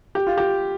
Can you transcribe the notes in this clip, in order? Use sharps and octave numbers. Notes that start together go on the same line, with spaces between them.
G4
F4
G4